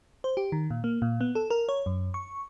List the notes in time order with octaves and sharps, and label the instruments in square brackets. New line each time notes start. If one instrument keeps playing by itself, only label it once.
[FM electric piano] C5
G4
D#3
A#2
A#3
A#2
B3
A4
A#4
C#5
F#2
C#6